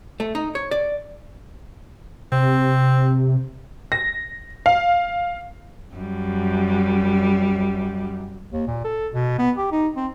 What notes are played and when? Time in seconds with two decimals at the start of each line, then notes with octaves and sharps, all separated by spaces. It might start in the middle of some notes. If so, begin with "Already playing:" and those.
0.20 A3
0.35 D#4
0.55 C#5
0.71 D5
2.32 C3 C4
3.92 A#6
4.66 F5
5.95 F#2 G3
8.52 D#2
8.67 A#2
8.84 A4
9.14 B2
9.38 B3
9.58 G4
9.72 D#4
9.96 C4